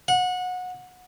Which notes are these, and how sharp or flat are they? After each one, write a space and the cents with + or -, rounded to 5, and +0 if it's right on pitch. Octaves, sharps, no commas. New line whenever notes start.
F#5 -25